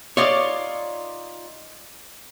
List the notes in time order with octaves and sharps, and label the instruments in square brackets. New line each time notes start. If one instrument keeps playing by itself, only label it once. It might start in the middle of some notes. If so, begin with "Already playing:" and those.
[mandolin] D#4 F4 D5 [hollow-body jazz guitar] C#5